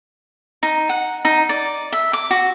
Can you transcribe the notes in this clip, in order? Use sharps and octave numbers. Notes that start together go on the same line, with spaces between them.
D#4
F#5
D#4
D5
E5
D6
F#4